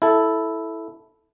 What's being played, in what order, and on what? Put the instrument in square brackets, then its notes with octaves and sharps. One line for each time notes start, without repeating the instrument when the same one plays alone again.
[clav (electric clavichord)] E4 A4